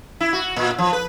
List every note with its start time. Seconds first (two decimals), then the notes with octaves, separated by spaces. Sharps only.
0.20 E4
0.33 F#4
0.56 A#2
0.78 F3
0.93 B4